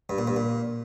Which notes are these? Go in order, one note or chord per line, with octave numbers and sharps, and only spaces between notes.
G2
A#2
G2
A#2